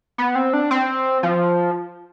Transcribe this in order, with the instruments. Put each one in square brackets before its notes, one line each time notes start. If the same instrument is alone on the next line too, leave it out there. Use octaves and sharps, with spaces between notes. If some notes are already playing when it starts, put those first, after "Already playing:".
[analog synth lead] B3
C4
D4
C4
F3